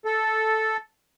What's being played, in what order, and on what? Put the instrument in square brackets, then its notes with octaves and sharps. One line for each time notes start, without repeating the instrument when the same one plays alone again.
[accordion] A4